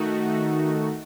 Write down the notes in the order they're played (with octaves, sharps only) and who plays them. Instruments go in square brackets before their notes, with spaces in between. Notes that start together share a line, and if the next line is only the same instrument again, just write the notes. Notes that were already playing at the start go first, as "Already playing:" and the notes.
Already playing: [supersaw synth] D#3 A3 D#4 F#4